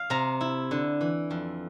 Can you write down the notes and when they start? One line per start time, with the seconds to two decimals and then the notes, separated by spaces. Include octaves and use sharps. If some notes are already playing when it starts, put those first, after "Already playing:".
Already playing: F5
0.10 C3 A#5
0.41 E4
0.71 D3
1.01 E3
1.31 F2